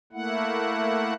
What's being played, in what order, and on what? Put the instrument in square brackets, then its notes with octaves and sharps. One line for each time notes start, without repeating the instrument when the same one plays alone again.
[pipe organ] A3 A#3 E4 F#5